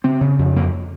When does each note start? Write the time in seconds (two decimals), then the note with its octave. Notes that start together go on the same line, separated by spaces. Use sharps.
0.04 C#3 C4
0.21 C#3
0.39 F2
0.56 F2 A#3